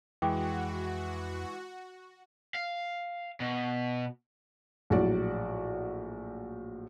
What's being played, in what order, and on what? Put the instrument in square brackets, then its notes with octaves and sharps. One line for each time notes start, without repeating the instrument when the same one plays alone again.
[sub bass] F2 [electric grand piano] E3 G#3 [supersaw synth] F#4 [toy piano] G5 C#6 D6
[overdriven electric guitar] F5
B2
[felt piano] A#1 A2 F#3 F#4 D5